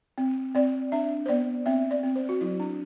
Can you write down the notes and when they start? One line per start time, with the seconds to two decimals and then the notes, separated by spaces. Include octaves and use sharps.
0.18 C4
0.55 C4 D5
0.92 D4 E5
1.26 C5
1.29 B3 D5
1.66 C4 E5
1.91 D5
2.03 C4
2.16 C5
2.29 F#4
2.41 F#3 E4
2.60 D4